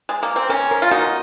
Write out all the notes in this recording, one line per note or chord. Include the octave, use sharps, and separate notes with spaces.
G#3
A#3
C4
C#4 A#4
A#4
F4
D#4 F#4